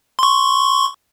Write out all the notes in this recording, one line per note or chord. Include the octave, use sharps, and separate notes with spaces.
C6 C#6